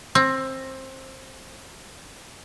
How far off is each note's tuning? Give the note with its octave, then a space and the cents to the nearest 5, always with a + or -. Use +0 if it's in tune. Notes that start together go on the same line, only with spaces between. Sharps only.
C4 +20